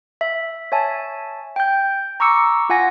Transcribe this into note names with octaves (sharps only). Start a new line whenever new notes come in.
E5
C#5 E5 G#5 A5
G5 G6
A#5 C#6 D6 E6 C#7
F4 F#5 G#5 A#6